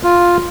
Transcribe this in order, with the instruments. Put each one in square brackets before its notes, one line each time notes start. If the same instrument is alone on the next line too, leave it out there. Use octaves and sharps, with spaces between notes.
[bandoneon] F4